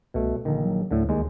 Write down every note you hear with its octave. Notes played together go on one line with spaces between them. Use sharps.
C2 B2 A3
A#1 D3 D#3
F#3
D2 A2 D3
D#2 G#3